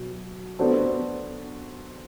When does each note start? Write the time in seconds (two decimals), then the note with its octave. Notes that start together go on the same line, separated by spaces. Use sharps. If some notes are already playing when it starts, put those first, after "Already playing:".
Already playing: B2 F#3
0.59 B3 D4 F#4 A4 C5